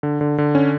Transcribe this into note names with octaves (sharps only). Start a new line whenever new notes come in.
D3
D3
D3
C#4